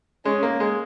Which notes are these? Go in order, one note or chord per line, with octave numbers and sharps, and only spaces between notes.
G#3 C#4
A#3
G#3